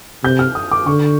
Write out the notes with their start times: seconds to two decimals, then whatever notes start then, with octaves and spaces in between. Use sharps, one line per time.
0.24 C3 G6
0.39 F6
0.55 D#6
0.71 D6
0.86 D3 C#6